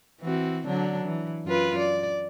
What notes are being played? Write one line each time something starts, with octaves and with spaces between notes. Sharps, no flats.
E3 C4 F#4
D3 F#3 D4
E3
F#2 F4 B4
D5